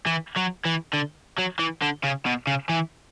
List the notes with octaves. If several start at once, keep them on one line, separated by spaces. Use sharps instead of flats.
E3
F#3
E3
D3
F#3
E3
D3
C#3
B2
C#3
E3